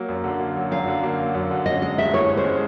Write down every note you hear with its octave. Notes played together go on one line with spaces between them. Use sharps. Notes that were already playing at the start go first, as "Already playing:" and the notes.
Already playing: F#3 A#3
F#2
D3
A#3
F#3
F#2 F5
D3
A#3
F#3
F#2
D3
C#4 D#5
G#3 D#5
G2 E5
E3 C#5
C#4
C5
G#3